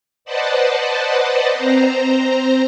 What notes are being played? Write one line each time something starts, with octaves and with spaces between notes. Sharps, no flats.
B4 C5 D5 D#5 F#5 A5
C4 C5 A#5